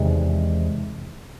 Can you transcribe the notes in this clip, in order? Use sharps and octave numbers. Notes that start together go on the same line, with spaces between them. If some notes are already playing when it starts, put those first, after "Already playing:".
Already playing: E2 C3 D#3 G#3